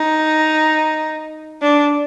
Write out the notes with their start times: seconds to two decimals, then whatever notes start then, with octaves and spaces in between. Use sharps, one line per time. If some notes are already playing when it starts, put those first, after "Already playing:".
Already playing: D#4
1.62 D4